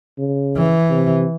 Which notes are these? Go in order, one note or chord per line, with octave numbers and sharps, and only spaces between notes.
C#3
E3
C3